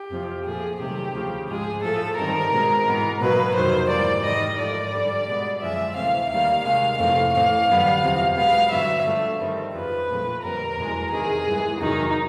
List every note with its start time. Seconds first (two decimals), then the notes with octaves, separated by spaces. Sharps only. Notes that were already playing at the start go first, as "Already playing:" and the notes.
Already playing: G4
0.10 F2 C3 F3
0.45 A#2 F3 A3 G#4
0.79 C3 D#3 F#3 A3 C4 G4
1.14 D2 C#3 F3
1.48 G#2 F3 G#3 G#4
1.82 A2 F3 A3 A4
2.16 G2 D#3 G3 C4 A#4
2.51 B2 G#3 C4
2.86 G#2 E3 G#3 B3
3.20 B2 F#3 A#3 B4
3.55 F2 C3 D#3 F#3 C5
3.89 G#2 E3 G3 A#3 D5
4.23 G#2 D#3 G3 D#5
4.57 G#2 F3 A3 D5
4.93 G2 D3 G3
5.27 B2 G#3 B3
5.61 F#2 D3 F3 G#3 E5
5.95 D2 C3 E3 A3 C4 F5
6.29 D#2 D#3 G3 A#3 F5
6.64 C3 D#3 G#3 F5
6.98 F2 C3 E3 A3 C4 F5
7.33 A2 E3 A3 C4 F5
7.67 F#2 D3 G3 B3
8.02 E2 C3 F3
8.37 B2 G#3 B3 F5
8.70 G2 D3 F#3 B3 E5
9.06 G2 D3 F3 A3
9.40 G2 D#3 G3 C4
9.74 F2 C#3 F3 B4
10.09 A#2 F3 A3 C4
10.43 F2 D3 G3 C4 A#4
10.77 E2 B2 G#3
11.11 E2 C3 D#3 G#4
11.46 G2 E3 G#3
11.80 E2 C3 D#3 F#3 D#4